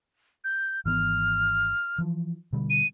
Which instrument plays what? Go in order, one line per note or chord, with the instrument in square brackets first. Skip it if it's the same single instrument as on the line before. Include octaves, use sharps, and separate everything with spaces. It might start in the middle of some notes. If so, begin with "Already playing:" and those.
[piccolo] G6
[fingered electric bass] G#1 E3 B3 [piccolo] F6
[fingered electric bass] E3 F3
B2 D3 G3
[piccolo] D#7